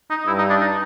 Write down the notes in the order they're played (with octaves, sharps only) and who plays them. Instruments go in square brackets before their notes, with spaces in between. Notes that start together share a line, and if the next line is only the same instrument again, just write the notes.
[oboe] D#4
[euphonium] G2 [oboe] E4
[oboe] D#4
D4
D#4